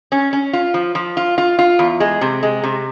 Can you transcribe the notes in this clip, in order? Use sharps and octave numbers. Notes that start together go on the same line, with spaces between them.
C#4
C#4
F4
F3
F3
F4
F4
F4
E2
G#3
C3
G#3
C3